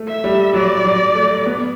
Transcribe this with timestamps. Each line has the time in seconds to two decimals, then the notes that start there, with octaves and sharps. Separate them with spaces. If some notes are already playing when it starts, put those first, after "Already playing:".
Already playing: A3
0.08 E5
0.24 G3
0.54 F#3 D5
0.85 F#3
1.15 A3
1.46 B3